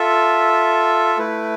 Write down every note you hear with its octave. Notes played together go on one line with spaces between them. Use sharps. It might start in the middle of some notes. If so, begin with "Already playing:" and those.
Already playing: F4 A4 E5
A3 E4 B4